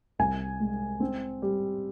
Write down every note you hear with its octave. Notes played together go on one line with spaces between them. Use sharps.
C2 G#5
G#3
C4
G3